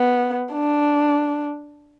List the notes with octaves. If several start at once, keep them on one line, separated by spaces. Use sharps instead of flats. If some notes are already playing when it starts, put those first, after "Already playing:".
Already playing: B3
D4